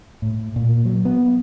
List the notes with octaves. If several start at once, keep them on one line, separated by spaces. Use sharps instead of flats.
A2
A#2
F#3
B3